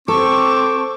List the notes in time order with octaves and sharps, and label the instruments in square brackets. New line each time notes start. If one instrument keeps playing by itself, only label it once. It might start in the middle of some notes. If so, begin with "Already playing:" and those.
[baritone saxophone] C4 [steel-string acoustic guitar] A4 [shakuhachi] C#6 [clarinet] D6